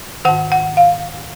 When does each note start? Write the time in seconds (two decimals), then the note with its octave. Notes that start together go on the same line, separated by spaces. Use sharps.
0.25 G#2 D#3 F#5
0.52 F#5
0.77 F5